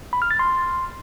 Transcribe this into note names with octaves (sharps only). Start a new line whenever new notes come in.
B5
F6
A6
C6